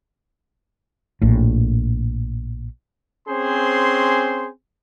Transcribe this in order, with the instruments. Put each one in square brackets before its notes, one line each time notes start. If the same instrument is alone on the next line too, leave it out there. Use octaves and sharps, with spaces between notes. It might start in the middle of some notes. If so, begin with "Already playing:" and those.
[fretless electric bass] A#1 A2
[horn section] C4 C#4 G#4 C5 C6